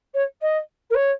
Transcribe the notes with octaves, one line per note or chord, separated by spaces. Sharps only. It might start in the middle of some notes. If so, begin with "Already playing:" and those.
C#5
D#5
A#4
C#5